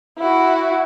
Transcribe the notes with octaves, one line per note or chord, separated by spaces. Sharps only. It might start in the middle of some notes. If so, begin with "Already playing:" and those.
E4 F#4